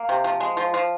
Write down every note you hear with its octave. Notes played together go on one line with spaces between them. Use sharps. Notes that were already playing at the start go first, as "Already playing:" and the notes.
Already playing: A#3
C3
F3
G#3
F3
F3